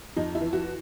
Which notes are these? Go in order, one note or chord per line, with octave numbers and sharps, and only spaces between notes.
F2 D#4
E4
E3
F#4